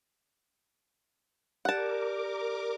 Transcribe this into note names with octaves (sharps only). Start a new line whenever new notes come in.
G4 A#4 D5 F#5 A5 D6